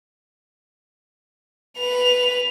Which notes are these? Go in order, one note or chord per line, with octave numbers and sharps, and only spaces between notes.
B4 F7